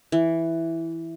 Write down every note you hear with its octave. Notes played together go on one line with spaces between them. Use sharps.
E3